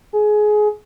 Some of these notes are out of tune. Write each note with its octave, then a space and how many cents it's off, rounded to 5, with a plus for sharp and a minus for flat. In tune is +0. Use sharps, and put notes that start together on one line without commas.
G#4 +20